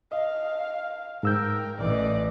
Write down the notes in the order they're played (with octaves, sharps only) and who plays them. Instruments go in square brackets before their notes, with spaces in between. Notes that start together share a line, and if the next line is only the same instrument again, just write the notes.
[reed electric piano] D#5 [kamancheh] F5
[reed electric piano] G#2 E6 G6 [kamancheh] A#4 G5
[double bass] A1 E3 [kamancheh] D5 D#5